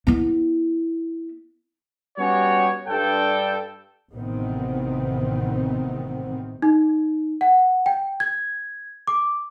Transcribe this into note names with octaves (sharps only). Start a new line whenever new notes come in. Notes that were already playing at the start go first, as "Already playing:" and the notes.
B3 E4
G3 B3 C#4 F#4 G4 C#5
G2 A4 G5
A1 C3 D#3 B3 C4
D#4
F#5
G5
G#6
D6